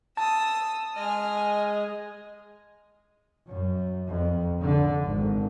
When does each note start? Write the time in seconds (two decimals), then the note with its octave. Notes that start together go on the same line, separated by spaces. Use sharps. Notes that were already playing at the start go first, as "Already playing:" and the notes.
0.17 A5 D#6 E6
0.96 G#3 D#5 G#5 F6
3.47 F#2
4.09 F2
4.60 D3
5.05 G#1